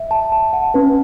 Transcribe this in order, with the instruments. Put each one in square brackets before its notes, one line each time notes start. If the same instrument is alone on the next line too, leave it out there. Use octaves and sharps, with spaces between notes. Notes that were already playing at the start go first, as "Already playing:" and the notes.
Already playing: [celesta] E5
A5
A5
F#5
[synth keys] C#4 [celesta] B4